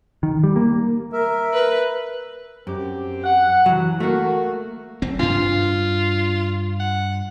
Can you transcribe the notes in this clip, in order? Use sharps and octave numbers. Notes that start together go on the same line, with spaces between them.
D#3
G3
A#3
A#4 E5
B4
F#2 C4 G4
F#5
E3 F#3
A3 A#3 F#4
F#1 C4
G2 D4 F4
F#5